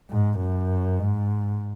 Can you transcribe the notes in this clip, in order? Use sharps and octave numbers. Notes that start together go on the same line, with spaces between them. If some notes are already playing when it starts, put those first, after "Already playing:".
G#2
F#2
G#2